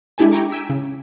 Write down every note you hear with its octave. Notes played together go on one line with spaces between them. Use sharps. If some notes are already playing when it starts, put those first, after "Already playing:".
G#3 D4 E4 G4 A4 G#5
E4 G5 G#5 A#5 C#6 D6
G5 G#5 E6 B6 D7
C#3